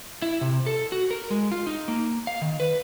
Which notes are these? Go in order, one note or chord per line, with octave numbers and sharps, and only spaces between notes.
E4
C3
A4
F#4
A#4
G#3
F4
D#4
A#3
F5
D#3
B4